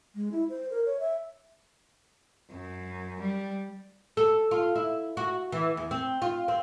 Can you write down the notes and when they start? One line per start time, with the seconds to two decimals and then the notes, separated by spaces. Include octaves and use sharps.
0.15 G#3
0.32 E4
0.50 C5
0.70 A#4
0.86 C#5
1.00 E5
2.51 F#2
3.21 G3
4.17 A4
4.51 F4
4.76 E4
5.17 F#4
5.52 E3
5.77 E2
5.91 C4
6.22 F4
6.48 C4